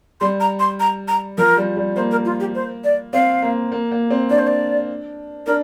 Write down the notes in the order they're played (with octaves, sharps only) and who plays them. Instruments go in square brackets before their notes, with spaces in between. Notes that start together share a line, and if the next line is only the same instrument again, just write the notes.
[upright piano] G3 [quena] C6
[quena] A#5
C6
A#5
A#5
[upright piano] F3 [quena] A#4
[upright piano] G3
G3
[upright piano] A#3 [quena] C5
[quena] A#4
F4
G4
C5
D5
[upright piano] C4 [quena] F5
[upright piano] A#3
A#3
A#3
C4
[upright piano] D4 [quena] D5
[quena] C5
D5
[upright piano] D4 [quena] A#4